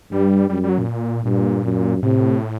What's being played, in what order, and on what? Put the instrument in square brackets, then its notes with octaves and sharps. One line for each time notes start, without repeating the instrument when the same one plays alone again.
[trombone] G2 [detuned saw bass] G3
[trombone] F#2 [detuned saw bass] G3
[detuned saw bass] G3
F#3
A#2
[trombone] G2 [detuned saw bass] A#2
[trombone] F#2
[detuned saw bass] A2 [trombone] C3